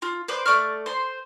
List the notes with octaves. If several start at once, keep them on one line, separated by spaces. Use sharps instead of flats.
F4
B4 C5 D5
A3 D5 C#6 F6
C5 C6